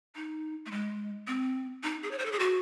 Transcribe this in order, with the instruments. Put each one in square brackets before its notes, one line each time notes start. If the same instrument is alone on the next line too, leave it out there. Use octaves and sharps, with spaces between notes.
[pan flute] D#4
A3
G#3
C4
D#4
G#4
C#5
C5
A4
G#4
F#4